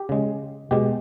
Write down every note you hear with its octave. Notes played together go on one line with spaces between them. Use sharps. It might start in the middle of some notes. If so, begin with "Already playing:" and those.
Already playing: G4
C#3 G#3
B2 G#3 G4